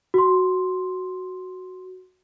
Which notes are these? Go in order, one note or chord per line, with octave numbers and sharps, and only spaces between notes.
F#4 C6